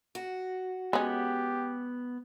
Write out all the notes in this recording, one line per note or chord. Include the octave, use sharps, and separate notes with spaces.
F#4
G#3 B3 C#4 G4